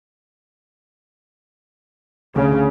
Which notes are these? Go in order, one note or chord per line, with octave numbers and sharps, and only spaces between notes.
D2 C#3